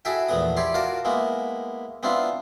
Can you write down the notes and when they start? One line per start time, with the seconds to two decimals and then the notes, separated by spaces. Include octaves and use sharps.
0.05 E4 F#4 G#4 A4 E5 G5
0.28 A#1 E2 A3 B3 D#6
0.57 E4 G4 C#5 D5 C6
0.74 F4 F#4 A#4 D5 A5
1.05 G#3 A#3 B3 E4
2.03 B3 C4 D4 E4 F4